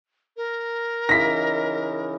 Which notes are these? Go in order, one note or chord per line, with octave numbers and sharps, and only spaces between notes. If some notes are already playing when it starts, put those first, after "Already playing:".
A#4
C#3 E3 D#4 A#6 B6